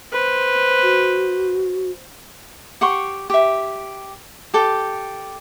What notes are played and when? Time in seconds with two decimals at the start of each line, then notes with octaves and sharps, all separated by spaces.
0.12 B4 C5
0.82 F#4
2.81 G4 F#5 C6 C#6
3.30 G4 E5
4.54 G4 A4 G5